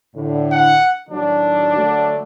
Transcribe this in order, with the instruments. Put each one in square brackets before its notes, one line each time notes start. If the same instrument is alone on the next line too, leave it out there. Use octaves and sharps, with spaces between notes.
[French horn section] A2 D3
[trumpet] F#5
[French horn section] A2 D#3 F#3 [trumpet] D4
[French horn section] D3 F#3 A3